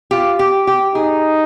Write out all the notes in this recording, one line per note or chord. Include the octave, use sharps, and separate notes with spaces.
F4 G4
G4
G4
D#4 G#4